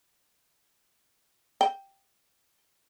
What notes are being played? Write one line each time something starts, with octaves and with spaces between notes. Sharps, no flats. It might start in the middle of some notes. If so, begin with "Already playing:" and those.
G5